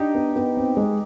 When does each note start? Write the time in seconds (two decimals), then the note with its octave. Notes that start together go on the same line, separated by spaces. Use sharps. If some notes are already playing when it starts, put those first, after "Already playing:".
Already playing: D4 D#4 G4
0.15 B3
0.36 B3
0.57 C4
0.77 G#3